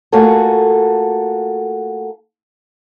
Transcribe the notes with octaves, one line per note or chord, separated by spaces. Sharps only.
A3 A#3 F4 F#4 G#4 A4